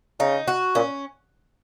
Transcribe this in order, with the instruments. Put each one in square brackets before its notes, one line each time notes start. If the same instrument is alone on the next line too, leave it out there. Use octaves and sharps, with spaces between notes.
[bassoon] C#3 [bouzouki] D#4
[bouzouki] F#4
[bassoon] A#2 [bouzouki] C#4